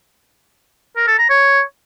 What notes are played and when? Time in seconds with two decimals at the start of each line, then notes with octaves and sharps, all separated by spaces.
0.97 A#4
1.08 A4
1.19 A#5
1.30 C#5